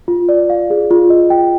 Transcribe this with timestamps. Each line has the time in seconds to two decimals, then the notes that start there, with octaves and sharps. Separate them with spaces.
0.08 F4
0.29 D5
0.50 F5
0.70 G#4
0.91 F4
1.10 D#5
1.30 G5